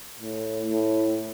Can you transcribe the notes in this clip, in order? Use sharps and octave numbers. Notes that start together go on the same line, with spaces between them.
A2
A2